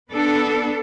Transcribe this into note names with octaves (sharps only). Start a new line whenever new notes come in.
B3 D4 A4